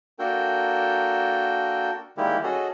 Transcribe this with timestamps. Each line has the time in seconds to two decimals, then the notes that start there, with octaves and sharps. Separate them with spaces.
0.19 A#3 D4 F#4 A4 A#4 G5
2.17 D#3 G3 G#3 A#3 E4 G4
2.44 C#4 F#4 G#4 A4 D#5